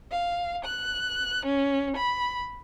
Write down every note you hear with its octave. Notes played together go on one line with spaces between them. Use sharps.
F5
F#6
C#4
B5